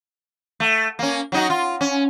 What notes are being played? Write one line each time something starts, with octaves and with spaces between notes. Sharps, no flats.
A3
A#3 C#4
F#3 D#4 F#4
F4
C#4